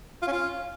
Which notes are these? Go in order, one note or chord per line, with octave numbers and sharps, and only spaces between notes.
F4
C#4
F4